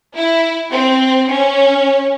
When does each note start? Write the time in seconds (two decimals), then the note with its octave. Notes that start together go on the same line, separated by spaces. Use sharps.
0.15 E4
0.72 C4
1.30 C#4